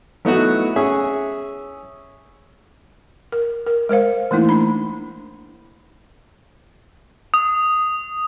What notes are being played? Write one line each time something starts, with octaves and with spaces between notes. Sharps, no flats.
F#3 A3 B3 D#4 E4 F#4
C#4 G#4 E5 C#6
A#4
A#4
G#3 A#4 C5 F5
E3 A3 A#3 D#4 E4
D4 B5
D#6